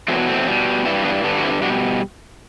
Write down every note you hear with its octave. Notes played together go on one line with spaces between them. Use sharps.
E2 B2 F#3 A3 C4
A3 C4
B2 G3
G2 E3 G3 E4
B3 D4
G2 D3 G3 B3 D4
F#4
C4 E4
B2 G3 D4 F#4